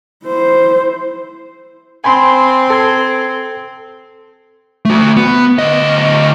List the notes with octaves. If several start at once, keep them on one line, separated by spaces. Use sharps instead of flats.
E4 C5
C4 G#5 B5 C6
A4 G#6
A3 F#4
B3
D2 D#5